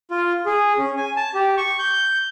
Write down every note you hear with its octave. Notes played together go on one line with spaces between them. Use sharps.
F4
G#4
C#4
G#5
A5
G4
C#6
G6